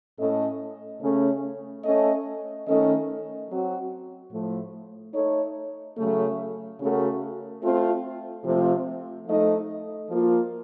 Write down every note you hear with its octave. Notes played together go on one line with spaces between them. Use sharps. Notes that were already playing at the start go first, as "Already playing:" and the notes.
A2 A3 C#4 A4 D#5
C#3 A3 C#4
A3 C#4 A4 D#5
D#3 A3 C#4 A4 D#5
F#3 C4 F#4
A2 F3 A3
A3 D#4 A4 C#5
C#3 F#3 A3
C#3 A3 C#4 F#4 A#4
A3 C4 F4
C3 F3 A3 C4 F4
F3 A3 D#4 A4 D#5
F3 A#3 F4